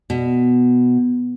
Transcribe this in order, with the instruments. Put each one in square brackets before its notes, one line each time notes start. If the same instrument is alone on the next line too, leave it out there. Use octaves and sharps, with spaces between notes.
[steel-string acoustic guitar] B2